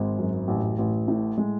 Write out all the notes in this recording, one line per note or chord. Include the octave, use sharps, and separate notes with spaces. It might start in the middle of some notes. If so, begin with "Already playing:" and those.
Already playing: G#1 G#3
F#2
A1
A1
A2
G#3